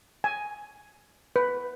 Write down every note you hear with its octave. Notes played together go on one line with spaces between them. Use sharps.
G#5
B4